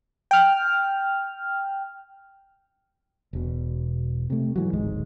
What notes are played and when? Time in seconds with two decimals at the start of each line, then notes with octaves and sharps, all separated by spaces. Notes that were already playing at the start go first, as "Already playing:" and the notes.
0.31 G5 F6
3.33 E1 B2
4.30 C3 A3
4.56 G#2 E3 F#3
4.73 D1 G#1 G#2 G#3